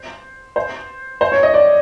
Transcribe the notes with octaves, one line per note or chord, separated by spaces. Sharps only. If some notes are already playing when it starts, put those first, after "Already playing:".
Already playing: C5
C5
C5
C#5
D#5
D5